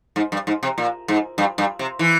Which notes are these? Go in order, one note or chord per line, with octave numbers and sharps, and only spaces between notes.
G#2
G2
G#2
C3
A#2
G#2
G2
G2
C3
E3